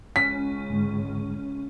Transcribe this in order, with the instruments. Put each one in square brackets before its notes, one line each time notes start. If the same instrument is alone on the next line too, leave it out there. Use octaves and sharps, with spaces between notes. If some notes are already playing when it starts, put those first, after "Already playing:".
[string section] C#2 [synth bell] C#4 [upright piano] B6
[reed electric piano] G#2 D3 G#3